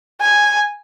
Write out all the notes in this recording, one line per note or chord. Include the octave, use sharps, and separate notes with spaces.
G#5